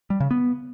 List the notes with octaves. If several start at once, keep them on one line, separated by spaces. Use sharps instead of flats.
G3
C#3
B3